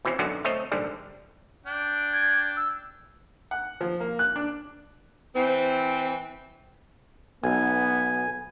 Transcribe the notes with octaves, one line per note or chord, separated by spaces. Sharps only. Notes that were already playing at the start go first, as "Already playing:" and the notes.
B2 E3 C4 C#4
B1 F#2 D3 F#3 F#4
A3 C4 C#5 D#5
A#1 G#2 D3 G3
D4 G5
G#6
E6
F#5
F3
A#3
F#6
D4
E3 C4
B1 B3 G#5